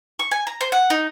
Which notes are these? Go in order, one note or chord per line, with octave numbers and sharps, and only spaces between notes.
C#6
G#5
A#5
C5
F#5
D#4